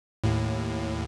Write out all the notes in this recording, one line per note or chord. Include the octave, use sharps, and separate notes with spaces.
D#2 A2